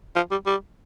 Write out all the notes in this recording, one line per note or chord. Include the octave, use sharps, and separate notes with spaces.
F3
G3
G3